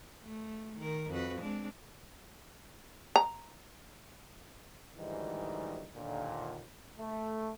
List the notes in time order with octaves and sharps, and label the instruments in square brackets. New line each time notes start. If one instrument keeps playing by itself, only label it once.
[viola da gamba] A3
D#3 A#4
F2 F#4 B4
G#3 C4 D4
[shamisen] A#5
[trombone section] D2 G#2 D#3 E3 G3 D#4
D#2 A#2 D3
A3